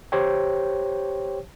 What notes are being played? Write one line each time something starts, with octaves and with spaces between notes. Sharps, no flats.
G4 C5 C#5 G5